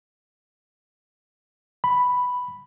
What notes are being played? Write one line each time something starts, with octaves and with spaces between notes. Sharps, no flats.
B5